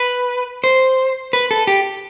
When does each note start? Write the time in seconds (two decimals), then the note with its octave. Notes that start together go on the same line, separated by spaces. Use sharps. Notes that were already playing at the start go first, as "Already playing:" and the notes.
Already playing: B4
0.64 C5
1.33 B4
1.51 A4
1.67 G4